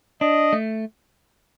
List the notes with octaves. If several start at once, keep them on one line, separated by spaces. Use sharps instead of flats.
D4 D#5
A3